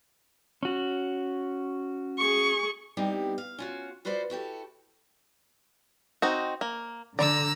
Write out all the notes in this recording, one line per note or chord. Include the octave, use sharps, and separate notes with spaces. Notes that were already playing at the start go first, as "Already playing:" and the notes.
C#4 F#4
G#4 C#6
G3 B3 C4 D#4 E4 G4
F5
C#4 F4 F#4
F4 F#4 B4 C5 D5 E5
E4 F#4 G4 A4
C4 D#4 F#4
A#3
D3 D5 A#5 E6